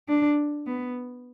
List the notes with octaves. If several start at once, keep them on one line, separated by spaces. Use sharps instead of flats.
D4
B3